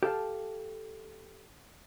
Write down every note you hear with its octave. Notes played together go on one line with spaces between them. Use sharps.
G4 A4 F5 A5